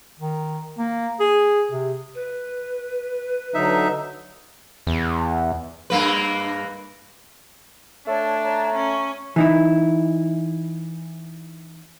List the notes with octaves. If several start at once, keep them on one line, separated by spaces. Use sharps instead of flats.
D#3
A#3
G#4
C3
B4
D3 F#3 D#4 E5
E2
G2 A#3 B4
A3 D4 C#5
C#5 A#5
C#4
E3 D#4 E4